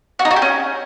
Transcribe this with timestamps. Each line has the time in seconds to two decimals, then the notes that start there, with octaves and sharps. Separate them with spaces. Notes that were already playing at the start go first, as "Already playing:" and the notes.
0.19 F#4
0.25 D#4
0.31 F#4
0.36 G4
0.42 C#4